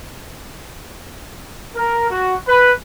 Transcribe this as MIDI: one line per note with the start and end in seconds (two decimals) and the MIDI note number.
1.75 2.08 70
2.09 2.34 66
2.48 2.71 71